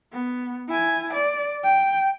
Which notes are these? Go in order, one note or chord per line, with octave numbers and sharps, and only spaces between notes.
B3
E4 G#5
D5
G5